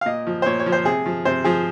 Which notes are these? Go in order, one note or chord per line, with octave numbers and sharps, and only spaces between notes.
F5
A#2 D#5
F3
C5
A#2 C#5
C#5
F3
C5
C3 G#4
F3
C3 C5
F3 G#4